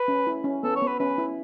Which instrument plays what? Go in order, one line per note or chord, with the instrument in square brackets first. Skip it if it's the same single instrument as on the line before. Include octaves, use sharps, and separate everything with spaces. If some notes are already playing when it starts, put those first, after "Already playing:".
Already playing: [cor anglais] B4
[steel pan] C#4
E4
C#4
[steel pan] B3 [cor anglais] A4
[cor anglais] C#5
[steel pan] B3
[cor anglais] B4
[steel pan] C#4 [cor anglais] B4
[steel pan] E4